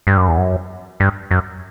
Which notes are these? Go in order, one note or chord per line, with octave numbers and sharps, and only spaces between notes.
G2
F#2
E2
F#2
G2
F#2